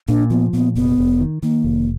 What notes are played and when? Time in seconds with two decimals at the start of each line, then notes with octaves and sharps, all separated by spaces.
0.08 A#2 D4
0.30 F3 B3
0.53 A#2 B3
0.76 F1 B3
0.98 F1
1.20 D#3
1.43 D#3 A#3
1.64 F1